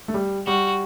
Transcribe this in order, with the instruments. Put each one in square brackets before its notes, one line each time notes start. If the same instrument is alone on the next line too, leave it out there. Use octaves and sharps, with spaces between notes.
[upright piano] A3
G3
[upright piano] G3 [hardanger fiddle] F#4